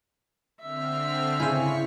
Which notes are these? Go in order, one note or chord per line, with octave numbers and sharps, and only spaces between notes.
D3 C4 E5 F6
C#3 E4 C5 G#5 C#6 B6